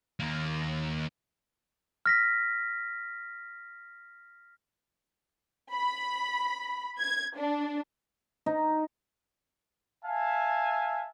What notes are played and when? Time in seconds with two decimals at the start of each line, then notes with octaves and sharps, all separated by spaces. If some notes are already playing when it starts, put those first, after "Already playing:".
0.20 D#2 A#3
2.06 F6 A#6 B6
5.74 B5
6.99 G#6
7.37 D4
8.46 D#4
10.04 E5 F5 G#5 A5